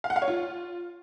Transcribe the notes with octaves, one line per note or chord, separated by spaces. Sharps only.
F5
F#5
F5
C#5
F4